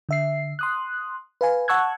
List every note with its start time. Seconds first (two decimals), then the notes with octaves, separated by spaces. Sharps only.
0.09 D3 E5 C7
0.59 C6 D#6 F#6
1.41 B4 F5 G#5
1.68 F#5 A5 C#6 E6 F#6 G#6